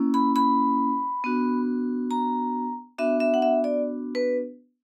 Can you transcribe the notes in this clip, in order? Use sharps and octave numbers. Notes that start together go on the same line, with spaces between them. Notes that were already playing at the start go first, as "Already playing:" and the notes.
Already playing: A#3 C#4 E4
B5
B5
B3 D4 F#4
A#5
B3 D4 F#4 E5
E5
F#5
E5
D5
B4